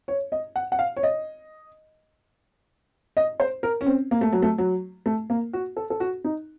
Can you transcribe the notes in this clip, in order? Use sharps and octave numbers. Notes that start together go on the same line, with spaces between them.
C#5
D#5
F#5
F#5
F5
C#5
D#5
D#5
C5
A#4
C#4
C4
A#3
A3
F#3
A3
F#3
A3
A#3
F#4
A4
A4
F#4
D#4